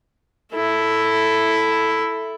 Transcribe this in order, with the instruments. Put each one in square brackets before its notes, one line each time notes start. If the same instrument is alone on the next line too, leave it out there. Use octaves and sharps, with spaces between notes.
[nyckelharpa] E4 A4